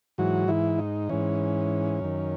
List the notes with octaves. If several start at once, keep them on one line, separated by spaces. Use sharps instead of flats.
G#2 E3 F#3 F#4
E3 E4
D#4
G#2 E3 C#4
F#2 D#3